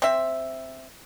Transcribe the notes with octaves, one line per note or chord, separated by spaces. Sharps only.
C4 E5